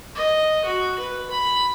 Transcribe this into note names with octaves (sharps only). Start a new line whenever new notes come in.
D#5
F#4
B4
B5